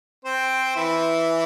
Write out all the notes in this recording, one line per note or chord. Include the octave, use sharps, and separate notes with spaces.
C4 C5
E3 E4